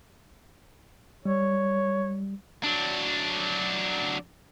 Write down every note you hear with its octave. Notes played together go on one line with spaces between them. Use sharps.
G3 C#5
F#3 D4